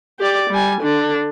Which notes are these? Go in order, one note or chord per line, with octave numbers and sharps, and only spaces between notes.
G4 D5
G3 G#5
D3 D4